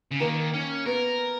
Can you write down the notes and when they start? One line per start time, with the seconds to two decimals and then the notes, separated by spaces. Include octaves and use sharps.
0.11 C#3
0.20 D#3 A#3
0.53 C#4
0.86 B3 A#4